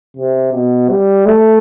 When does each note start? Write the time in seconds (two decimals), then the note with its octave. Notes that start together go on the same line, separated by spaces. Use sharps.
0.17 C3
0.53 B2
0.90 G3
1.26 A3